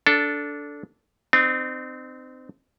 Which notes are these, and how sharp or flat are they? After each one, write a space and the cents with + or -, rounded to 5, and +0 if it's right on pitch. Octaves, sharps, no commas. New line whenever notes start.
D4 -15 A4 +0
C4 -25 D#4 -40